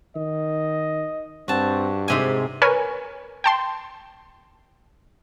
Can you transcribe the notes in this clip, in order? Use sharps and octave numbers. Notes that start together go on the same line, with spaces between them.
D#3 D#5
G2 C4 F#4 A5
G#2 C3 G#3 G#5
A#4 B4 C#5 G#5
G5 A5 C6